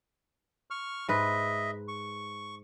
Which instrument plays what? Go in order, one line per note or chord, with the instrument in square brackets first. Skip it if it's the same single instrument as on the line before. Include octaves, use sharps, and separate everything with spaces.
[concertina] C#6 F6
[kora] G#2 B4 [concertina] D#5 E5
[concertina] C#6